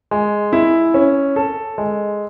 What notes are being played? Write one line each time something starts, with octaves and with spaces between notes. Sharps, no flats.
G#3
E4
C#4
A4
G#3